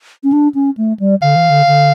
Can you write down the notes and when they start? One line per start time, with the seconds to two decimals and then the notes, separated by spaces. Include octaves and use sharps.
0.23 C#4
0.33 D4
0.55 C#4
0.77 A3
1.00 G3
1.22 D3 F5
1.36 E3
1.50 D3
1.67 D3